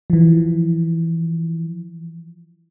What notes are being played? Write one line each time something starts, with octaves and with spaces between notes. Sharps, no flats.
E3 F3